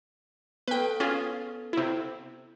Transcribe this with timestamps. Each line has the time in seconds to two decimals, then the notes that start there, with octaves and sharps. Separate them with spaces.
0.68 B3 A4 B4 G5
1.00 C#4 F4 G#4
1.73 C3 E4